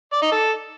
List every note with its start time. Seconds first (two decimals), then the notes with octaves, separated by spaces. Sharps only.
0.13 D5
0.22 D#4
0.32 A4